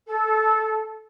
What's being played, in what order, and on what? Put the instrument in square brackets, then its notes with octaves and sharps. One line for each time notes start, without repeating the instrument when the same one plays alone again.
[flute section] A4